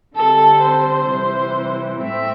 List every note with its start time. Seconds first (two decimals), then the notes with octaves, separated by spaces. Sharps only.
0.14 D3 G3 C4 A4
0.61 C5
1.08 C3 E3 G3
2.01 A2 A3 C4 E5